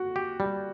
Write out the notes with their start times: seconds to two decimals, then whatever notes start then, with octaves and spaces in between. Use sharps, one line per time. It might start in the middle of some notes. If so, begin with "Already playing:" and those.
Already playing: F#4
0.16 G4
0.40 G3